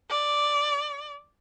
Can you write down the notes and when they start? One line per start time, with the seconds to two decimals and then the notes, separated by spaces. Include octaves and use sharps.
0.10 D5